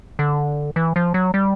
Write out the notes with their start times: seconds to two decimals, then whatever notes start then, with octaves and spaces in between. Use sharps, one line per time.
0.19 D3
0.76 E3
0.96 F3
1.14 F#3
1.34 G3